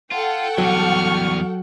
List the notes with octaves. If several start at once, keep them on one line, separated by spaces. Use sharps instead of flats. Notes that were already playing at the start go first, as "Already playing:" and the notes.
F4 A4 F#5 G5
E2 F#3 G3 C#6 F6